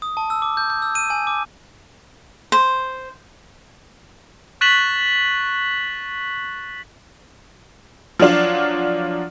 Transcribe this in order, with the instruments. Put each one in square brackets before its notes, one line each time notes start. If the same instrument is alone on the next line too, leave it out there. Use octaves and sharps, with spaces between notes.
[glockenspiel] D#6
A5
E6
D6
G6
G6
E6
D#7
G#5
D6
[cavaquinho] C5
[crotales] C#6 F#6 A6 B6 E7 F#7
[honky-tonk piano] F3 F#3 D4 F4